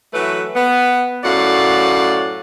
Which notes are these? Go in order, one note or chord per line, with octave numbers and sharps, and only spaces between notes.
E3 F#3 A3 B4
B3
F#2 A2 D5 F5 F#5